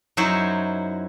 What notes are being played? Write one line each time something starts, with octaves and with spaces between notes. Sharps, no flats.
F#2 F#3 D#4 E4 C5 C#5